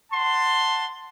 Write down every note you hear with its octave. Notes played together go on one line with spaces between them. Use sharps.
F#5 A5 C6